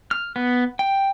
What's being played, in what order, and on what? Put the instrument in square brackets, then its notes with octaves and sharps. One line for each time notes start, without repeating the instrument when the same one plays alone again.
[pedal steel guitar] F6
B3
G5